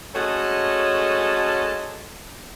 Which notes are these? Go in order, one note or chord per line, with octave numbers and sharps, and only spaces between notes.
G#3 A3 C#4 F#4 A4 D#5